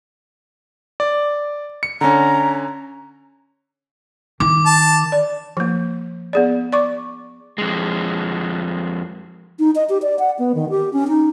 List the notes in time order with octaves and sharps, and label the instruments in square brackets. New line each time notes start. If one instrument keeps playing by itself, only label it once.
[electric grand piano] D5
C#7
[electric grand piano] D3 C#4 [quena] A#5
[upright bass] D#3 [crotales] D6
[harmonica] A5
[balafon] D5
F3 A#3
B3 G#4 D5
D5 C#6 D6
[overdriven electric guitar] F2 G#3
[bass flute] D#4
D#5
G4
D5
F#5
B3
D#3
G4
C#4
D#4